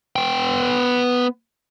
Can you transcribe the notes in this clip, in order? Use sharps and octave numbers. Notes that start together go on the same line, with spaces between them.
B3 G5